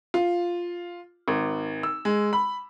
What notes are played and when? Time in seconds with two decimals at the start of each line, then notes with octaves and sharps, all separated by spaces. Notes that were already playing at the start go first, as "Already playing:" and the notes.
0.14 F4
1.28 G#1
1.83 E6
2.05 G#3
2.33 B5